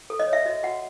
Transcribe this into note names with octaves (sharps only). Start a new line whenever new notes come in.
A4
D#5
C#5
E5
F#4 D#5
F#4 F#5